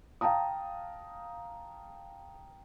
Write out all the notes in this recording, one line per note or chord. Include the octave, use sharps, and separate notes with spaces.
F5 G5 A5 A#5 D#6